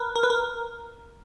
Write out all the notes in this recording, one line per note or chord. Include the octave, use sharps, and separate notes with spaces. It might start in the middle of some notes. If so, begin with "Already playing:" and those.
Already playing: A#4 B4
A#4
B4
A#4